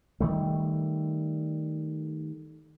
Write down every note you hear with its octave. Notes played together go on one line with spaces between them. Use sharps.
D#3 G3 A3